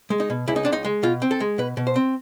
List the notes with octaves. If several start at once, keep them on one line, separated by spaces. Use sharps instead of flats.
G#3
D#4
B2
C#2 E4
D#4
C#2 D4
D#4
G#3
B2 F4
C4
A4
G#3
B2 B4
B2
C5
C4